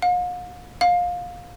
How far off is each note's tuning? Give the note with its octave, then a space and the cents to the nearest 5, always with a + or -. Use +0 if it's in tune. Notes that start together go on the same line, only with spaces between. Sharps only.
F5 +45
F5 +25